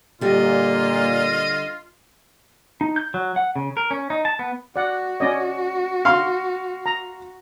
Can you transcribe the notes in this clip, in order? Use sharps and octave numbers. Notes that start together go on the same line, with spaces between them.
A#2 D3 G3 F4 D#5
D#4
G6
F#3
F#5
C#3
A#4
C#4
D#4
A5
B3
F#4 D5 F#5
C#4 D5 D#5
F5 C6
A#5